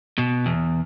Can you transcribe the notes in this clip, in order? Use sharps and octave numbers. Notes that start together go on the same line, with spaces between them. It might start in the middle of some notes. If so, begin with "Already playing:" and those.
B2
E2